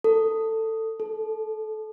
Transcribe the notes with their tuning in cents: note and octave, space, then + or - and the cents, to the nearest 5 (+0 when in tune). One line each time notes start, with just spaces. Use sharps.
A4 +15
A4 -25